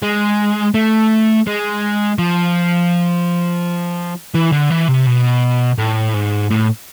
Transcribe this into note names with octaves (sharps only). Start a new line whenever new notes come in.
G#3
A3
G#3
F3
E3
D3
E3
C3
B2
A2
G#2
A2